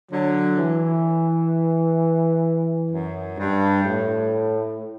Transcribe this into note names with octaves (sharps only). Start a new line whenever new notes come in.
D3 F#3
E3
F#2
G2
A2